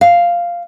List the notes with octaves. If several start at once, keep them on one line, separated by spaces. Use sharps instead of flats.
F5